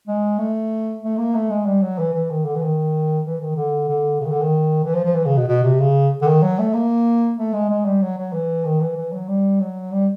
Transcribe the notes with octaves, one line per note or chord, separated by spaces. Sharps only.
G#3
A3
A3
A#3
A3
G#3
G3
F#3
E3
E3
D#3
D3
E3
D#3
E3
D#3
D3
D3
C#3
D#3
D3
D#3
E3
F3
F3
E3
C#3
B2
B2
C3
C#3
D3
D#3
F#3
A3
A#3
A3
G#3
G#3
G3
F#3
F#3
E3
D#3
E3
E3
F#3
G3
F#3
G3